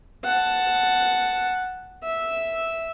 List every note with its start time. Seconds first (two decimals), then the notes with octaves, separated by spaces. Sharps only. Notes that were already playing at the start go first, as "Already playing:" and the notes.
0.24 F#5 A5
2.04 E5